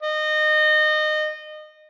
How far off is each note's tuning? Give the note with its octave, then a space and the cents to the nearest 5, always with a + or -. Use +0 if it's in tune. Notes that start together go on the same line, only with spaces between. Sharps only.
D#5 -25